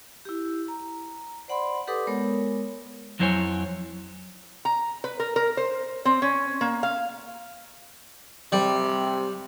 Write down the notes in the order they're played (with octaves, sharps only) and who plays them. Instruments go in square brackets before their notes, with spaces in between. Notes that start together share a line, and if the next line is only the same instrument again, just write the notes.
[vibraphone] E4 G4
A#5
C5 D5 F#5 B5 C6
G4 A4 B4 F#5 D6 D#6
G#3 B3 A#4 C#5
[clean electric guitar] F2 F#3 E4 C5 C#5 G#5
[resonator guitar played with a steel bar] A#5
B4
A#4
A#4
C5
C4
C#4
A#3
F5
[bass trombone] C3 [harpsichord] G3